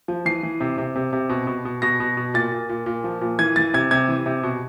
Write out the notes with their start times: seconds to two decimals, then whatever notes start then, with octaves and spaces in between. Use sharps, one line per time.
0.08 F3
0.25 E3 C7
0.43 E3
0.60 C3
0.78 C3
0.95 C3
1.13 C3
1.29 B2
1.47 B2
1.65 B2
1.82 B2 A#6
2.00 B2
2.17 B2
2.34 A#2 A6
2.52 A#2
2.69 A#2
2.86 A#2
3.04 F3
3.21 A#2
3.39 E3 G#6
3.56 E3 A6
3.74 C3 G#6
3.91 C3 G#6
4.08 E3
4.26 C3
4.43 B2